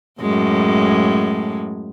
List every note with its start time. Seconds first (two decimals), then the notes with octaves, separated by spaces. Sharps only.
0.20 F#2 A2 G#3